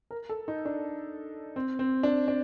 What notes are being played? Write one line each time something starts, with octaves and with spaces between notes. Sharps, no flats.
A#4
A4
D#4
D4
C4
C4
D4
D4